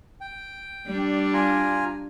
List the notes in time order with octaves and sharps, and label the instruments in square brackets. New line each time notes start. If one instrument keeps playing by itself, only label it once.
[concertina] G5
[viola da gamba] G3 D4
[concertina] F4 G#5 A#5